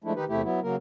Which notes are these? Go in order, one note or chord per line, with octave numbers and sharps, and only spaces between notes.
F3 G#3 A3 D4 E4
D#3 D#4 G4 B4
E2 C3 A3 E4 G4
F#3 B3 E4
C#3 F#3 A#3 A#4